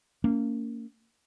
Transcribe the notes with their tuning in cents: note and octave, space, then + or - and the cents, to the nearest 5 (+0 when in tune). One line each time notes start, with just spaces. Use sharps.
A#3 -25 C#4 +30